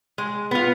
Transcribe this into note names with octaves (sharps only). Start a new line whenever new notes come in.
G#3
B3 F4